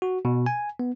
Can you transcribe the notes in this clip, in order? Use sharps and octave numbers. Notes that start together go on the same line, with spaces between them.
F#4
B2
G#5
B3